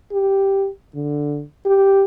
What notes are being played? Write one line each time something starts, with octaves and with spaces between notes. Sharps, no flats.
G4
D3
G4